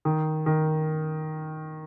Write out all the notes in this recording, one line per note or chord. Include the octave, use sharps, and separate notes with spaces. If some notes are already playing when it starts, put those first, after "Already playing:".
D#3
D#3